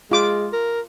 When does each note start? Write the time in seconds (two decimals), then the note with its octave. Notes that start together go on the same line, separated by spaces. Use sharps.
0.11 G#3 F4 D6
0.53 A#4